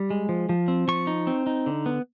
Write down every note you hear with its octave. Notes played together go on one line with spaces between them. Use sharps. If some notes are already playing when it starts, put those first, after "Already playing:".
Already playing: G3
G#3
F3
F3
C4
F3 C#6
D#4
C4
D#4
D3
B3